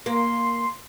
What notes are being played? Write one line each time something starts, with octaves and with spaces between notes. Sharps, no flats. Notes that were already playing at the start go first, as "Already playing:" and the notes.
A#3 C6